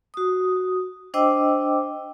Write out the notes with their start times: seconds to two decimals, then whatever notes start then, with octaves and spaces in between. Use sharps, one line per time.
0.14 F#4 D#6
1.14 D4 C5 D#5 G5 D6 E6